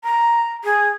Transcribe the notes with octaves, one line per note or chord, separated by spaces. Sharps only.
A#5
G#4